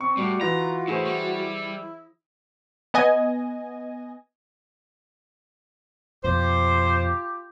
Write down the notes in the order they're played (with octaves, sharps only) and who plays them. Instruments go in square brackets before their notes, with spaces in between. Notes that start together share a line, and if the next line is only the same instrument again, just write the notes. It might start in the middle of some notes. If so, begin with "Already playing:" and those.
[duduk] C4 [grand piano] C#6
[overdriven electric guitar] A2 [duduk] G3 [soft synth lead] F#4
[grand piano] E3 A#6 [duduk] F4 [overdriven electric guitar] A#5
[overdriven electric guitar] A2 [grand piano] E3 G#4 C5 [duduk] E4
[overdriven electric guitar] G3
[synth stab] B3 D#5 G#5
[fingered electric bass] F2 B2 [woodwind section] F4 G4 [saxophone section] C5